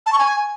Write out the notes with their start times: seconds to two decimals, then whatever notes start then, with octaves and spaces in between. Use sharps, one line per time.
0.06 A5
0.12 C#6
0.19 G#5